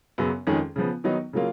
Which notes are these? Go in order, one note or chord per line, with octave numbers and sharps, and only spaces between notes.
F#2 C#3 F#3 B3
F2 D#3 G#3 C#4 G#4
C#3 F3 B3
D#3 F#3 B3 D#4
C#3 F#3 A#3 F4